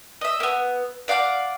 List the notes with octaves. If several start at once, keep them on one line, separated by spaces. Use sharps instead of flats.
D#5 E5
A#3 B3
D5 F5 F#5 D6